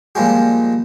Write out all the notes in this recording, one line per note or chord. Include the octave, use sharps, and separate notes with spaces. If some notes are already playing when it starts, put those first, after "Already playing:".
A#2 F3 G3 G#3 G4